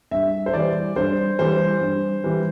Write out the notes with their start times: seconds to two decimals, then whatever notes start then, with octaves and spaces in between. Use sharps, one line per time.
0.11 G2 E5
0.46 C5
0.53 E3 G3 D5
0.96 G2 C5
1.39 E3 G3 C5
1.81 G2
2.24 E3 G3